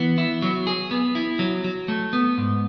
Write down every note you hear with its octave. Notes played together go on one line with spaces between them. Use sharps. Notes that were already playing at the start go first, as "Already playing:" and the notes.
Already playing: E3 B3
E4
F#3
G#4
B3
E4
F#3
F#3
A3
B3
G#2